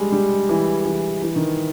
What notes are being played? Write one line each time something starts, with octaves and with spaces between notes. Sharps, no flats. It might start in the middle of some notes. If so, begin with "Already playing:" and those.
Already playing: G3 G#3
G3
E3
E3
E3
D#3